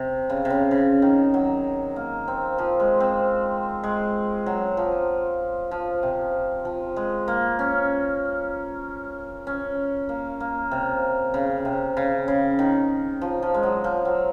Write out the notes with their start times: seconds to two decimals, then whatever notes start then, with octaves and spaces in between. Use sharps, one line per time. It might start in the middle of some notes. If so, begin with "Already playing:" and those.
Already playing: C3
0.30 C#3
0.45 C3
0.50 C#3
0.71 C#3
1.02 D#3
1.34 F#3
1.96 A#3
2.28 C4
2.58 F3
2.80 G#3
3.00 C4
3.84 G#3
4.46 F#3
4.77 F3
5.71 F3
6.03 C3
6.65 F3
6.96 G#3
7.28 A#3
7.59 C#4
9.47 C#4
10.09 A#3
10.40 A#3
10.71 C3
11.34 C#3
11.65 C3
11.97 C#3
12.28 C#3
12.59 D#3
13.22 F3
13.43 F3
13.54 G#3
13.63 F#3
13.84 F3
14.05 F#3